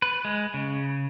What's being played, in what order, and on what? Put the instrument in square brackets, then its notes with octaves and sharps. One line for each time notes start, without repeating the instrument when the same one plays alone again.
[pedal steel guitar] B4
G#3
C#3